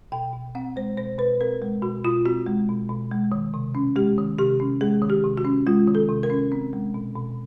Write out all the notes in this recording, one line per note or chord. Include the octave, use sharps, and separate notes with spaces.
B2 G5
B2
C4 F#5
G#3 C5
B2 C5
B2 B4
C4 A#4
G#3
B2 F#4
B2 F4
C4 F#4
G#3
B2
B2
G#3
D#3
C3
C#4
G#3 G4
D#3
C3 G4
C#4
G#3 G#4
D#3
G4
C3
F#4
C#4
G#3 F4
D#3
A4
C3
A#4
C#4
C4
G#3
B2
B2